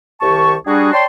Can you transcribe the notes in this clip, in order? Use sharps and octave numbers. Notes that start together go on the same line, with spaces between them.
C2 D#3 G4 A5 C#6
G3 D4 F#4 G#4
C#5 D5 G5 A5 C6